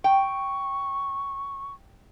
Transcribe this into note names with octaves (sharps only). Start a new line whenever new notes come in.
G5 C#6